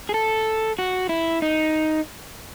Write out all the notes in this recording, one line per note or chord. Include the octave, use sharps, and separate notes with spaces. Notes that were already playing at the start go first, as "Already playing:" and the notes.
G#4
A4
F#4
E4
D#4